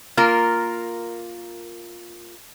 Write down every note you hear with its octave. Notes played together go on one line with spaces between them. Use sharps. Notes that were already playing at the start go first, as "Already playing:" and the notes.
A#3 F4 A#4